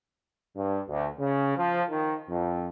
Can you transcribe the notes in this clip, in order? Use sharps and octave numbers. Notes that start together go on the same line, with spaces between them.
G2
D2
C#3
F3
D#3
F2